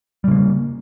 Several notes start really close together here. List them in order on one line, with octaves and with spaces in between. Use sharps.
G3 C#3 A#3